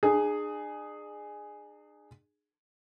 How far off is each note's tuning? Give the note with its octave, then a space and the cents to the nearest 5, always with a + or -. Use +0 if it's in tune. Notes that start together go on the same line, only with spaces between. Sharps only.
D4 +45 G#4 +0